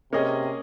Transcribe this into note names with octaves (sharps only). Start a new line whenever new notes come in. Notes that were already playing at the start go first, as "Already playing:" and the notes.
C3 A#3 C#4 G#4 D#5